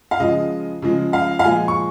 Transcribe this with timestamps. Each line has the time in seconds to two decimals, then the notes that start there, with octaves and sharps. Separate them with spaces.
0.11 F5
0.20 C#3 F3 G#3 D#5
0.82 C#3 F3 G#3
1.13 F5
1.39 F5
1.44 A#2 F3 G#3 G#5
1.68 C#6